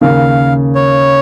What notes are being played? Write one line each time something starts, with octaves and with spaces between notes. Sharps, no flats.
D#2 C#3 A#3 F5
C#5